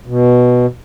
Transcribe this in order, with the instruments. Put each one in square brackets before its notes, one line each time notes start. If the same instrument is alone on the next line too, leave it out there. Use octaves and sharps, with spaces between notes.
[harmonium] B2